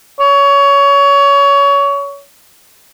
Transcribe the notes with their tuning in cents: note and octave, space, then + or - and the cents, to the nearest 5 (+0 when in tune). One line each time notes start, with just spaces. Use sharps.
C#5 +25